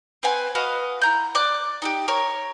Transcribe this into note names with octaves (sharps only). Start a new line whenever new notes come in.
C4 B4 F#5 G#5
F#4 B4 D#5 F5
E4 A#5 G6
D5 D6 F#6
D#4 F#4 G4
A#4 C#5